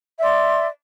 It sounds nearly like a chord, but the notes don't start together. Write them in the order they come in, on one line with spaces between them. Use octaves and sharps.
E5 D5 C6